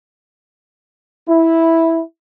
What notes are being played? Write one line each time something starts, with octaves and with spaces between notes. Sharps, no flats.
E4